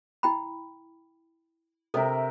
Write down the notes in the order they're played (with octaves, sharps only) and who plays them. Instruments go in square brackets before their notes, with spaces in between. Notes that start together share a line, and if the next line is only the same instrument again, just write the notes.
[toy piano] E4 G5 B5
[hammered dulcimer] C3 A#4 E5 [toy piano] A4 D#5